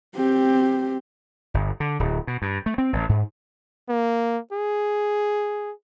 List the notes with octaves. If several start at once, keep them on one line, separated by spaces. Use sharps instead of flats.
C4 G4
G1
D3
D1
B2
G2
A3
C4
A1
G#2
A#3
G#4